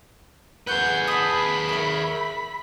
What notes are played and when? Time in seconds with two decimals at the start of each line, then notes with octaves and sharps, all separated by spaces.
0.67 A3 G#4 B4 F#5 F#6 G6
1.08 A5 B5 D#6
1.69 A#4 C#5 E5